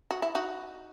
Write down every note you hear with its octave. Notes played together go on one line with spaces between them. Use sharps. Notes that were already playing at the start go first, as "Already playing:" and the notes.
F#4
E4
D#4 F#4